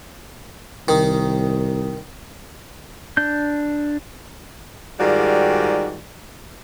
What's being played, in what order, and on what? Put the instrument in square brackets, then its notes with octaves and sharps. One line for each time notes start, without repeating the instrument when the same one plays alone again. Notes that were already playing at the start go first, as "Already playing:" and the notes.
[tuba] C2 [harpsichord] D#3
[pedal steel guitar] D4 G6
[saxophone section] G#2 D#3 G3 F4 F#4 D5